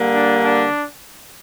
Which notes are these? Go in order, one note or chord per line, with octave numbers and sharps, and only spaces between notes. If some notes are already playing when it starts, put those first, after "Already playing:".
Already playing: D3 G3 A#3
D4
D4